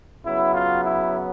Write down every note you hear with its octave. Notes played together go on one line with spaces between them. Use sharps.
C#3 F#3 B3 E4
F4
E4